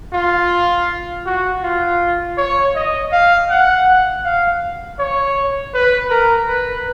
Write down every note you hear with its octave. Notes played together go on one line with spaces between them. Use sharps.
F4
F#4
F4
C#5
D#5
F5
F#5
F5
C#5
B4
A#4
B4